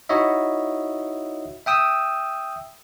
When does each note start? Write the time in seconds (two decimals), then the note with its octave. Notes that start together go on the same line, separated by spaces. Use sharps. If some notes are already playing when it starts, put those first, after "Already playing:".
0.09 D#4 E4 F#4 C#5 D#5 E5
1.66 E5 G5 D#6 E6